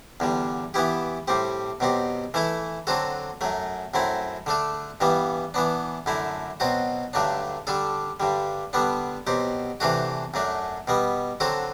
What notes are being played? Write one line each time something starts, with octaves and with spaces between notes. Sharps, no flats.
E2 D3 G3
E3 B3 E4 G4
A2 G3 C4 G4
B2 F#3 C4 G4
E3 A3 E4 A4
D3 F#3 C4 F#4 A4
F#2 F#3 A3
F#2 F#3 A3 C4 E4
D3 A3 D4 A4
G2 E3 G3 B3
E3 B3 D4
F#2 D3 A3 E4
B2 F#3 C4 F#4
G2 D3 F#3 A3 D4
D3 G3 D4 A4
G2 D3 G3
D3 G3 B3 D4
B2 F#3 C4 G4
C3 E3 A3 D4 F#4
F#2 F#3 A3 D4
B2 G3 B3
D3 F#3 C4 F#4 A4